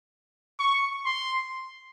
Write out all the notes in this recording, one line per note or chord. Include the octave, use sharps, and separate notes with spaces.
C#6
C6